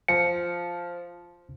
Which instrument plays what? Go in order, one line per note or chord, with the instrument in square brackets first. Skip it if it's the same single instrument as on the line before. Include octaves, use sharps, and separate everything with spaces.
[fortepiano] F3 [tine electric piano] C#7